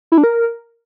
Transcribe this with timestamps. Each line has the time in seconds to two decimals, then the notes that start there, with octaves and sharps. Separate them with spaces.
0.12 E4
0.18 D4
0.24 A#4